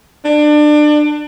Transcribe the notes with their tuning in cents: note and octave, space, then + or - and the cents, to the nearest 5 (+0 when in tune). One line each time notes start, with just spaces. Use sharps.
D4 +25